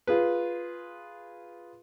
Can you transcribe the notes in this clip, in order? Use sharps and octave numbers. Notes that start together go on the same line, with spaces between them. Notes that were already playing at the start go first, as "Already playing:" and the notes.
F4 G#4 B4